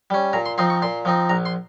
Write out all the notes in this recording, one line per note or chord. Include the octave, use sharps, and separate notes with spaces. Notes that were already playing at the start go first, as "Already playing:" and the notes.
G3 C#4
A#2 A#5
C6
F3 C4 D#4 C6
C#6
A#2 C6
F3 C4 D#4
A#1 A#5
C6